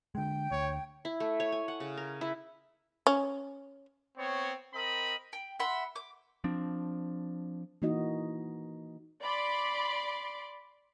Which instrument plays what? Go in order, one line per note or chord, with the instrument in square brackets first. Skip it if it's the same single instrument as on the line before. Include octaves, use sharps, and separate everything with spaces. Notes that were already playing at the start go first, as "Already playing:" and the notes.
[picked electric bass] D3 G#3 [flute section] G5
[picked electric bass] D2 [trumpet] C#5
[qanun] E4
A3
C#5
G#5
F#5
C#3
A#4
E4
[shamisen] C#4
[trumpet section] B3 C4 C#5
C4 A#4 D#5 B5
[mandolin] G5
E5 F#5 B5 C6
D6
[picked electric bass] F3 C4 D4
[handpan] E3 A#3 D#4 F#4 D#5
[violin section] D5 B5 C6 D6